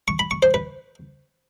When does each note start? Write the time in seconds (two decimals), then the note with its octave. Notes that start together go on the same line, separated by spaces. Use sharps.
0.08 C#6
0.19 B5
0.31 C#6
0.43 C5
0.54 B4